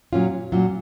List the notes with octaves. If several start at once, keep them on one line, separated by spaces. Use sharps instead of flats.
A#2 F#3 C#4 F4
A#2 F#3 C#4 F4